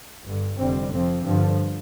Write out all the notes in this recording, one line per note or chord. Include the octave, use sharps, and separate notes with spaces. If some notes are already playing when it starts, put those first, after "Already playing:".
G1 G2 D3
F1 F2 D3 G3 C4
F2 F3 C4
G2 D3 F3